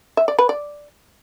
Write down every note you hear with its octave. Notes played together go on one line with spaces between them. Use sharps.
E5
D5
B4
D5